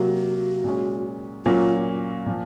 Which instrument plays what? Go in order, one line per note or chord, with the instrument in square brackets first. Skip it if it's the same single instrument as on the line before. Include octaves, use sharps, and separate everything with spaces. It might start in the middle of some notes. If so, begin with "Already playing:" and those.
Already playing: [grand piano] C3 F#3 A#3 [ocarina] F#4
[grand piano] A#2 G#3 C#4
[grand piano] A#2 F#3 A#3 C#4 [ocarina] F4
[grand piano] A#2 F3